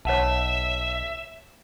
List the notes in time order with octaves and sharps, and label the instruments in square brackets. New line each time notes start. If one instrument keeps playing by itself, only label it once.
[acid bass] B1 [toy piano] C#5 F#5 A5 [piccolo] E5